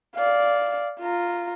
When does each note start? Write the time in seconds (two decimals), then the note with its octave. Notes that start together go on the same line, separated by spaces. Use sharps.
0.16 D5 F5
1.00 F4 A#5